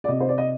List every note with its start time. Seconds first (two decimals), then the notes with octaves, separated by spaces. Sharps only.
0.04 D5
0.08 C3 D#5
0.20 C5
0.29 D5
0.38 D#5